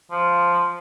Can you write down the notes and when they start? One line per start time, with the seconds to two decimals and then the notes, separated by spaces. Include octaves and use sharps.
0.11 F3